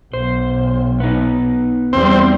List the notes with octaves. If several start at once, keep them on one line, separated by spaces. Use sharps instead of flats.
B1 C5
B3 D#4
E2 G3 C4